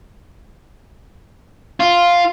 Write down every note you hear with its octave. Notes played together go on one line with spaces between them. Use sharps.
F4